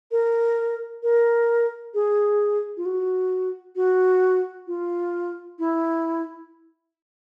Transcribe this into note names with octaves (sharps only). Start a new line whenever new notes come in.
A#4
A#4
G#4
F4
F#4
F#4
F4
E4